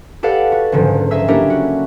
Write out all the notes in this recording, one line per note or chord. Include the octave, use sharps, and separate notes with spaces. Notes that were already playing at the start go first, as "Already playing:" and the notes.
G4 A4 B4 D5 F5 F#5
F#4
F#1 G#2 D3 F3
D#4 G#4 E5 E6 B6
A#3 C#4 D4 E4 G4 A#4
F#4